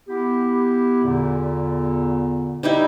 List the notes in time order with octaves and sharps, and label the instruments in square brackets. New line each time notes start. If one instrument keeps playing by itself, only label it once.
[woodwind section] B3 E4 G4
E2 A#2 D3
[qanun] G3 D#4 E4